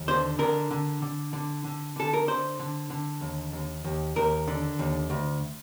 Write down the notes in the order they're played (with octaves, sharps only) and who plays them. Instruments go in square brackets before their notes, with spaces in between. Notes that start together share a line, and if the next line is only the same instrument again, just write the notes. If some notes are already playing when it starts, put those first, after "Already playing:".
Already playing: [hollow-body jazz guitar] D#2
D3 C5
D3 A#4
D3
D3
D3
D3
D3 A4
A#4
D3 C5
D3
D3
D#2
D#2
D#2
D#2 A#4
D3
D#2
D2